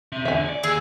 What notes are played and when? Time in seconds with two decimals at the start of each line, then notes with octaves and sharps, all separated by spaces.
0.12 C4 E5
0.25 E2 D3 E5 G#5
0.45 C#5 D5
0.64 D#2 G#4 E6